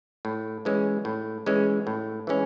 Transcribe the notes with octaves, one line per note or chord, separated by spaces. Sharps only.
A2
E3 G#3 C#4
A2
E3 G#3 C#4
A2
E3 G#3 C#4